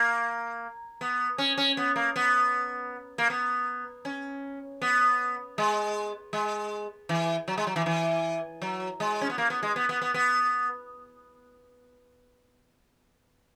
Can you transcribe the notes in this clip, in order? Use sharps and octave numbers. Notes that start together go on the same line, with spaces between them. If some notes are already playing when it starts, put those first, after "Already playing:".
Already playing: A#3
B3
C#4
C#4
B3
A#3
B3
A#3
B3
C#4
B3
G#3
G#3
E3
F#3
G#3
F#3
E3
E3
F#3
G#3
C#4
B3
A#3
B3
G#3
B3
B3
B3
B3